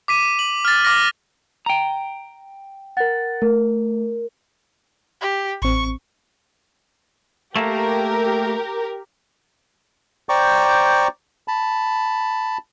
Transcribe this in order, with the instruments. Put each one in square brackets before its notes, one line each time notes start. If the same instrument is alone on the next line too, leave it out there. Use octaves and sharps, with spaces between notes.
[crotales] D6 B6 D#7
F#7
F6 A6
D6 F6 A#6
[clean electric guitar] G5 A#5
[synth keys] A#4 F#5 [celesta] A6
[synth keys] A3 [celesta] A#4
[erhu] G4
[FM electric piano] A1 C4 [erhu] C#6
[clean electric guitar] A3 A#3 [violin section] G4 A#4
[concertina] C5 D5 G5 A#5 C#6 D6
A5 B5